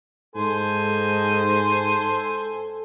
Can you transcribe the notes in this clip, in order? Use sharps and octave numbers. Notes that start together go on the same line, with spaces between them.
G#2 A4 C5 G#5